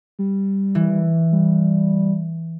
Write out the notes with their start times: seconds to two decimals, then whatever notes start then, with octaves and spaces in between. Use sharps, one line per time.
0.19 G3
0.75 E3
1.32 G3